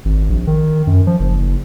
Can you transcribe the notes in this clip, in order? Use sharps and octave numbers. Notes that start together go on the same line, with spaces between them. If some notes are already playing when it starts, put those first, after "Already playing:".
G#1
A#1
D#3
F#2
F3
F#1